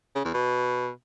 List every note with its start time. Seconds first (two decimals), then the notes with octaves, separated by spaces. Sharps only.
0.15 C#3
0.25 E2
0.34 B2